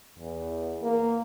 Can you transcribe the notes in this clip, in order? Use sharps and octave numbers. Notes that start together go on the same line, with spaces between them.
E2
A#3